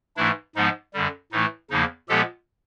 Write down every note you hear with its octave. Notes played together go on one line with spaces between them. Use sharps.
G#2 E3 A3 D4 E4
G#2 F3 G#3 B3 D#4
F#2 D3 G3
A2 E3 A3 D#4
E2 C#3 F3 A#3 D#4
A#2 F3 G#3 B3 G4 A4